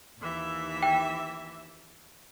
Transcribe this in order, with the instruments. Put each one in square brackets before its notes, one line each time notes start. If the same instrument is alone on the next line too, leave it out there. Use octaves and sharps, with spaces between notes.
[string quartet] D#2 E3 E5
[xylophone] G5